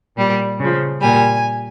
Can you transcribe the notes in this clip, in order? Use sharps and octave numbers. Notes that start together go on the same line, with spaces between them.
A#2 G3
C#3 F3
A#2 G3 G#5